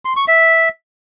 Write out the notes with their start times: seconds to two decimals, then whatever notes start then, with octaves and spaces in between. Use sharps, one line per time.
0.05 C6
0.16 C#6
0.28 E5